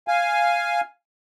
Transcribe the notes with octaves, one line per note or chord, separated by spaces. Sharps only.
F5 G#5